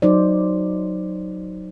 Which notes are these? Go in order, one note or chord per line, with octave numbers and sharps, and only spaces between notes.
F#3 D#4 C5 D5